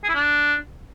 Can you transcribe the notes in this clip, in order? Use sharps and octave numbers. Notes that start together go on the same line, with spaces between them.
G#4
E4
D4